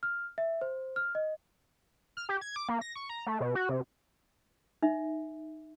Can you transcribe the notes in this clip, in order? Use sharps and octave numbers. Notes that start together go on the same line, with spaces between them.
F6
E5
C5
F6
D#5
F6
G4
G#6
D6
A#3
A#6
C#6
A#5
A3
B2
F#4
C3
D#4 E5